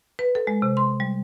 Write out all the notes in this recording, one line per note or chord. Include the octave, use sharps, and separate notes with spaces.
B4
A4
G#3
C3
C6
G3